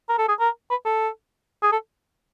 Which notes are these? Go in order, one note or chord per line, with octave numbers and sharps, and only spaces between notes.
A#4
A4
G#4
A#4
B4
A4
G#4
A4